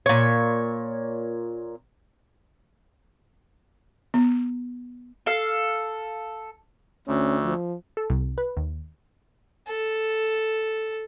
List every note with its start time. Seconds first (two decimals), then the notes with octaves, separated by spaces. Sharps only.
0.06 A#2 C#5
4.14 B3
5.27 A4 F5
7.07 D2 C#4
7.44 F3
7.97 A4
8.10 C2
8.38 B4
8.57 D#2
9.68 A4